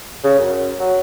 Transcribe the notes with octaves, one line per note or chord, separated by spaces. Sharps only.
C#3
F#2
F#3